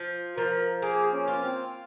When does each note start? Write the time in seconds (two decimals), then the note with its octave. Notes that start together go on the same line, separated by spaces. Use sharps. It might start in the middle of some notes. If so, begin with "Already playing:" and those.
Already playing: F3
0.38 F3 A#4
0.82 A#3 G#4
1.13 C#4
1.28 F4
1.43 C4